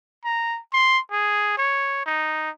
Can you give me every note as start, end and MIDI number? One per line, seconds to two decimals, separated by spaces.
0.25 0.59 82
0.73 0.99 84
1.11 1.53 68
1.58 2.04 73
2.06 2.50 63